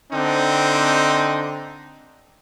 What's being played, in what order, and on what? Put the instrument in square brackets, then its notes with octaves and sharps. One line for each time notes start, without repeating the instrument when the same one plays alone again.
[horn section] D3 C4 D4 D#4